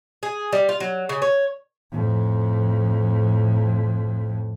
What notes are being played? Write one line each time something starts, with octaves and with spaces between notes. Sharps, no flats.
G#4
G3
F4
F#3
C#3
C#5
F2 A2